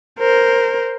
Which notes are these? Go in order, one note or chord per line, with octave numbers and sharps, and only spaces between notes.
A#4 C5